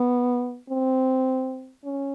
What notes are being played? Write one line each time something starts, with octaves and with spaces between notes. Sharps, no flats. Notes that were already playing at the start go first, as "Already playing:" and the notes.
Already playing: B3
C4
C#4